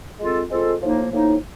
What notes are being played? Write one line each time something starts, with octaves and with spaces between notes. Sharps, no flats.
G#3 C4 F4 A4
G#3 C4 F4 A4
A2 F3 A#3 D#4
A2 F3 A#3 D#4